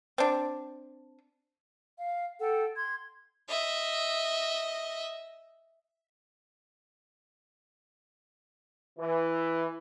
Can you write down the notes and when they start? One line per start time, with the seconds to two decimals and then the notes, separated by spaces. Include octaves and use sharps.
0.18 C4 D4
1.98 F5
2.40 A4 F#5 G5
2.75 C6 G#6
3.49 D#5 E5
8.99 E3